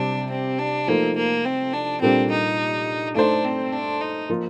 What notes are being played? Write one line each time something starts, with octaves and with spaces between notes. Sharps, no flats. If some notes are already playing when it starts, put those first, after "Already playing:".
Already playing: C3 G3 C4 D4 G4
C4
D4
F3 A3 A#3 D#4 A4 C5
A#3
C4
D4
A#2 G3 A#3 C4 D4 A4
D#4
A3 D4 D#4 A4 C5
C4
D4
D#4
F3 A#3 F4